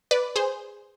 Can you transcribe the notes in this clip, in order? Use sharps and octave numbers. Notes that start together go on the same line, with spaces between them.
B4 D5
G#4 C5